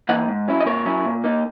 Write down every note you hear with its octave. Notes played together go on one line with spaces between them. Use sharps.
E3 A#3 D#4 D#5 F#5
G#2
F#3 C#4 E4
D#5
A#2 A#4 C#5
F#3 C#4 E4
A#2
A#3 D#4